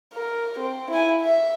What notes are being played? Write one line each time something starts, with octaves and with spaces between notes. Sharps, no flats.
A#4
C4
E4 G#5
E5